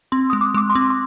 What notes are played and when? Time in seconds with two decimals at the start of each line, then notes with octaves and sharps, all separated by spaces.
0.12 C4 C6
0.30 G#3 D#6
0.41 D6
0.54 G#3 D6
0.69 C6
0.75 C4
0.90 C6